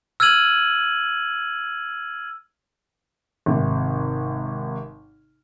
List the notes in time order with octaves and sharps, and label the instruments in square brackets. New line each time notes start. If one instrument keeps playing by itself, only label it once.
[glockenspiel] E6 F6 G#6 D#7 F#7
[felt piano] G#1 C3